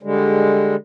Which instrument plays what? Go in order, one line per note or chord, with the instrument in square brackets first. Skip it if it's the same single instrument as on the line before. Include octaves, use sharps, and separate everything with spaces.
[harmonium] D3 G3 G#3